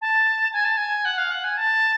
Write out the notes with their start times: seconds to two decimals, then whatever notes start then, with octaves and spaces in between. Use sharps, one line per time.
0.01 A5
0.53 G#5
0.65 A5
0.77 G#5
1.05 F#5
1.18 F5
1.31 F#5
1.44 G#5
1.57 A5